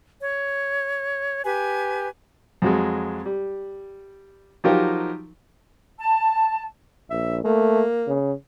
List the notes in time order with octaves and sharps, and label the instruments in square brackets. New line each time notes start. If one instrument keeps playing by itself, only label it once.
[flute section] C#5
G4 B4 G#5
[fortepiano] F2 F#3 G#3
G3
F3 F#3 D#4 F4 G4 A#4
[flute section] A5
[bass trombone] A#1 [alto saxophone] E5
[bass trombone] A3 [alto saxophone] A#3
[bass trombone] C#3